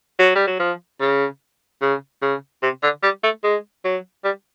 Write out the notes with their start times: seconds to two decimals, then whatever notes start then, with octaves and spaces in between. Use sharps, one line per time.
0.19 F#3
0.36 G3
0.47 F#3
0.60 F3
1.01 C#3
1.82 C#3
2.22 C#3
2.63 C3
2.83 D3
3.03 G3
3.23 A3
3.44 G#3
3.85 F#3
4.24 G3